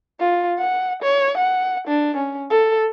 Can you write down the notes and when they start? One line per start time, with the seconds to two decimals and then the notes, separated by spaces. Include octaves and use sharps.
0.20 F4
0.59 F#5
1.02 C#5
1.37 F#5
1.87 D4
2.16 C#4
2.50 A4